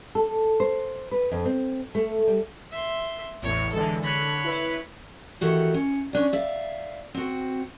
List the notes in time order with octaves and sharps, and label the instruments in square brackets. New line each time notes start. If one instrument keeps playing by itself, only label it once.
[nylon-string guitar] A4
C5
B4
F2
C4
A3
G3
[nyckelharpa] E5 C6
[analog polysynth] A1 E2 A2 [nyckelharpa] C#5
[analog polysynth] D3 E3 G#3 [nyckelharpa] A4
[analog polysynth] D3 F#6 [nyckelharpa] C#5 B5
[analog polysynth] E4 B4
[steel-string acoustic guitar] D#3 E3 A3 F#4 G4
C#4
C#4 D4 D5
D5 E5 F5
C4 F#4